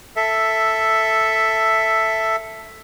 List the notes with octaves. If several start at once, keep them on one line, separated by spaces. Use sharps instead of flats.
A4 E5